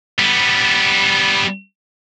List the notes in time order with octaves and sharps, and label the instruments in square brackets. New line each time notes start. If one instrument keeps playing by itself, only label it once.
[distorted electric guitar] G3 B3